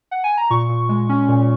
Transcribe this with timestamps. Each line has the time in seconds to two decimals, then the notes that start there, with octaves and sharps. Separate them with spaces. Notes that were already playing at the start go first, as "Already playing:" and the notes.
0.11 F#5
0.24 G#5
0.37 A#5
0.50 A#2 C#6
0.69 A#2
0.89 G#3
1.09 C#4
1.28 A#2